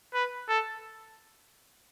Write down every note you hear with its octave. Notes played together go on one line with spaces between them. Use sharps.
B4
A4